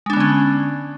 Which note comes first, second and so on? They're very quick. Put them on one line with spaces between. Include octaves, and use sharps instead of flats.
G#3 D4 B3 D3 C#4